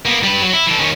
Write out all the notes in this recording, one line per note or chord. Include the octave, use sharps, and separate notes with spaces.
A#3 B3
G3 B4
F#3
E4
E3 A4
D#3 C#4